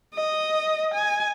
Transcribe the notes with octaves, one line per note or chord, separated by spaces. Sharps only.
D#5
G#5